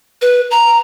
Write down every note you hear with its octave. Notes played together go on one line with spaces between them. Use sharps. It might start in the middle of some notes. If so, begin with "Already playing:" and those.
B4
A#5